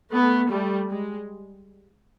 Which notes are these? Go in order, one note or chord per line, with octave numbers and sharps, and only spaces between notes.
A3 B3
G3 A3
G#3